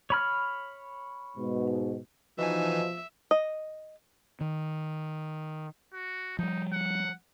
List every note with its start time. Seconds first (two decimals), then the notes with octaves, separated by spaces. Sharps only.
0.10 C#5 B5 F6
1.37 G#2 B2
2.38 B2 E3 F3 D#4 E5 G#5
3.31 D#5
4.41 D#3
5.94 F#4
6.39 F3 G3 D#4
6.73 F#5